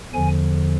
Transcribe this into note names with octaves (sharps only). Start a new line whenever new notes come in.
E2 D3 F3 G#5